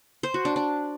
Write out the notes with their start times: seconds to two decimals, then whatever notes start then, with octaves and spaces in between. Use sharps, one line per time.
0.23 C5
0.34 F#4
0.45 D4
0.56 D4